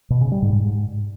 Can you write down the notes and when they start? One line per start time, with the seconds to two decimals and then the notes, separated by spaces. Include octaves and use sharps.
0.10 B2
0.21 C#3
0.32 G3
0.42 G#2
0.53 G#2